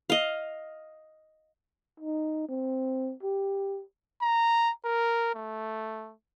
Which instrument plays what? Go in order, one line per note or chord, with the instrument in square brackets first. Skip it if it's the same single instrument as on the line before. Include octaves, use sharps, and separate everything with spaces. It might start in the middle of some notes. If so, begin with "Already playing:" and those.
[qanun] D#5 F5
[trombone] D#4
C4
G4
[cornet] A#5
A#4
A3